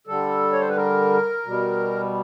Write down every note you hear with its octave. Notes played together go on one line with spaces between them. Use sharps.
D3 G3 A4
C#5
C5
B4
A#4
B2 G3